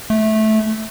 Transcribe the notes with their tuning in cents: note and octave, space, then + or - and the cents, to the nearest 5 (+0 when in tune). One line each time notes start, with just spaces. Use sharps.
A3 -15